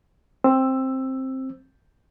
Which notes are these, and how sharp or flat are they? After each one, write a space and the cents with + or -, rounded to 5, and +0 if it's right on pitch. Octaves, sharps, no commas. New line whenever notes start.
C4 +10 E6 +5